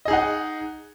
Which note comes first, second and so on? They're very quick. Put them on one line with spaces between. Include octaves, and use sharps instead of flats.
D#5 G#4 D#4 F#5